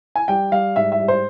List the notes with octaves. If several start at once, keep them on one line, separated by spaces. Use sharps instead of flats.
G#5
G3 G5
G3 F5
G#2 E5
E5
G3
C5